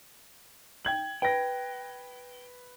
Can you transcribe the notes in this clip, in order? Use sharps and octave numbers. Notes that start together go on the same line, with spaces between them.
G5 G#6 F#7
B4 G5 A#6